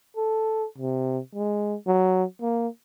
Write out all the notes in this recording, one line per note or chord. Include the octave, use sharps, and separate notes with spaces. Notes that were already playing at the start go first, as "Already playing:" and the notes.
A4
C3
G#3
F#3
A#3